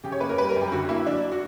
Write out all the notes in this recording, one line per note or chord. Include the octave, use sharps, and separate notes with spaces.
C#3 G4
C#5
A#3 B4
A#4
G3 B4
A#4
F#2
G4
D3 F#4
A#3 E4
F#3 D4
F#4